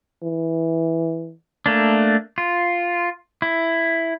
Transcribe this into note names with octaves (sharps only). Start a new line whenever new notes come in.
E3
A3 A#3 D4
F4
E4